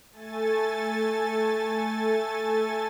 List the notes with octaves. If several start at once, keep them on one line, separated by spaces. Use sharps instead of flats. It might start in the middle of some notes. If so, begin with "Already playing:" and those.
A3 A4 G#5 A6